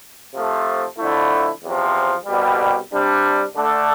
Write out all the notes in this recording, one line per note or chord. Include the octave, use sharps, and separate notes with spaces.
C3 F3 A3
F2 D3 A3 E4
E2 C3 F3
C2 B2 G3
C3 G3 D4
D3 A3 D4 A4